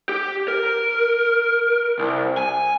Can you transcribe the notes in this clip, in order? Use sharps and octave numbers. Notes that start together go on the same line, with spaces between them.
G4
A#4
C2
G#5